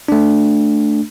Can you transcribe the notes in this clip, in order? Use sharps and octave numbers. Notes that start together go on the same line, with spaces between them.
A3 D4